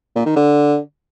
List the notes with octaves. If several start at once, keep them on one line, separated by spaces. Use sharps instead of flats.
A#2
D#3
D3